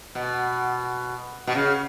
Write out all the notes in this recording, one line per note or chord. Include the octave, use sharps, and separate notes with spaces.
B2
B2
C#3